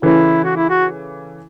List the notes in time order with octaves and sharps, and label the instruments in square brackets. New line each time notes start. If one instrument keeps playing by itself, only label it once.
[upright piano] C#3 E3 A3 C#4 [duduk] E4
[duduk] F#4
E4
F#4